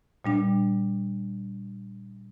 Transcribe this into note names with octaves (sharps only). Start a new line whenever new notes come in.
A#2 G3 D4